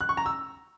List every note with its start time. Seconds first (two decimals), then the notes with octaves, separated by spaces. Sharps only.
0.01 F#6
0.09 C#6
0.17 A#5
0.26 E6